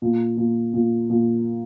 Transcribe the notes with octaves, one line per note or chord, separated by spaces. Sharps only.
A#2
A#2
A#2
A#2